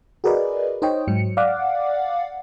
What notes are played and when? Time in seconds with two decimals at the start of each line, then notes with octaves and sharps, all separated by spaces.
0.24 F#4 G#4 A#4 B4 D5 D#5
0.82 D#4 C5 C#5 D#5 G5
1.08 G#2 F#3 C#7
1.37 D5 F5 F#5 D6